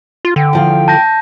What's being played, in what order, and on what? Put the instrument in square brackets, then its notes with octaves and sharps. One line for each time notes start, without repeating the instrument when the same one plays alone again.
[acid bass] F4
[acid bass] D3 [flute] G5
[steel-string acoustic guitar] E2 F3 F5
[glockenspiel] A5 G6 A#6